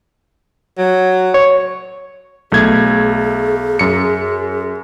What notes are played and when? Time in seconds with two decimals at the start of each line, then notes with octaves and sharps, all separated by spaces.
0.78 F#3
1.34 C#5
2.52 B1 A3 G#4 G#6
3.79 F#2 C#7